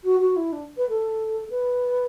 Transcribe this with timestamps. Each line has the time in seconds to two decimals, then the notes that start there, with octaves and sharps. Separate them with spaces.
0.04 F#4
0.20 F#4
0.36 E4
0.52 D4
0.77 B4
0.89 A4
1.50 B4